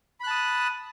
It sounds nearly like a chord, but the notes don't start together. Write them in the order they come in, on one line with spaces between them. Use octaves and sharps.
B5 F#6 A5 D#6